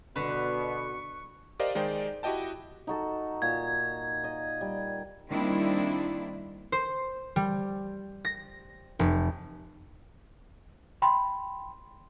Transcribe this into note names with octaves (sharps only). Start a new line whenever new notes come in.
B2 D3 B4 C#6
G4 A#4 C5 D5 D#5 F5
D#3 G#3 D#4 C5 D5 G5
E4 F#4 G4 D#5 G5 A5
D#4 F#4 A4
A#2 G#6
D#5
G3
D#3 G3 A#3 C4 D4 E4
C5
G3
A#6
F1
G5 B5 C6